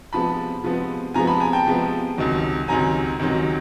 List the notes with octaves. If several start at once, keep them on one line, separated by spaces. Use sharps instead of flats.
C3 F3 G#3 B3 A5 B5
C3 F3 G#3 B3
C3 F3 G#3 B3 G#5 A#5
A5 B5
G#5 A#5
G5 A5
C3 F3 G#3 B3
C#2 C3 D#3 F#3
C#2 C3 D#3 F#3 G#5 A#5
C#2 C3 D#3 F#3